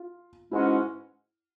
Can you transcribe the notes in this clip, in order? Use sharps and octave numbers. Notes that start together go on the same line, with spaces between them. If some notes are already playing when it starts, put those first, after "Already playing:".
Already playing: F4
G#2 E3 G#3 C#4 E4 F#4